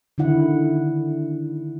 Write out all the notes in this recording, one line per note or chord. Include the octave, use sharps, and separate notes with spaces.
D3 D#3 E4 F#5